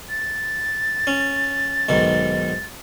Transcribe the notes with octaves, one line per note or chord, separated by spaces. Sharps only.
A6
C#4
B1 G#2 D#3